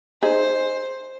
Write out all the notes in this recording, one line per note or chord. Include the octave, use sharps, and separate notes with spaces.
D#4 G#4 C5 E5